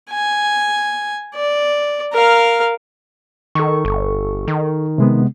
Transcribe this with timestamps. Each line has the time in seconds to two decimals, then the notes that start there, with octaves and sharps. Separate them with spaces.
0.10 G#5
1.35 D5
2.13 A#4 F5
3.55 D#3 A4 C#6
3.85 G1
4.48 D#3
4.98 C3 G#3 B3